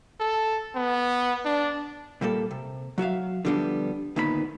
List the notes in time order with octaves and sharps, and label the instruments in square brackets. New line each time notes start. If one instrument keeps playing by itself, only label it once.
[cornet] A4
B3
D4
[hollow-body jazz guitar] A#2 G3 A#3 A4
C3
F#3 F#4 E5 F5
D3 F3 G3 B3 D4
D2 A#2 D#3 B3 F4 B5